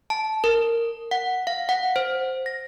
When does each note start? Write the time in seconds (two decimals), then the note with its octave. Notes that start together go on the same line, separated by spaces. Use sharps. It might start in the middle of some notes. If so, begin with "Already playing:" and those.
0.10 A5
0.44 A#4
1.11 F#5
1.47 F5
1.69 F#5
1.96 C5
2.46 A#6